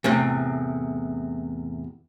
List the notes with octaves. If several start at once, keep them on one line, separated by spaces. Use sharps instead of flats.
E2 A2 C3